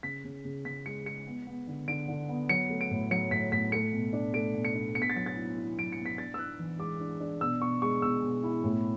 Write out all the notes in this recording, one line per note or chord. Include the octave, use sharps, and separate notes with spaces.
C#3 B6
C#3
C#3
C#3 B6
G#3 C#7
G#3 C#7
B3
B3
D3
D3 D7
D3
B3
F#3 C#7
A3
D7
A2
F#3 C#7
A2 B6
A2 B6
A3 C#7
B2
D4
A3 D7
B2
C#7
D4
B3 C#7
B6
A6
F#3 B6
A6
E4
E4
F#3 D7
C#7
B3
B6
D4 A6
E6
D4 F#6
E3
G#3 D6
D4
D4
B2 E6
B2 C#6
G#3 C#6
B2 E6
B2
E4
A2